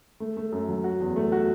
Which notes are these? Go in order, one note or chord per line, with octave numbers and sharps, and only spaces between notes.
A3
A3
F#2
F#3
F#4
E2
A3
F#4